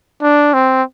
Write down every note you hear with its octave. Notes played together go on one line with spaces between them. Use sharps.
D4
C4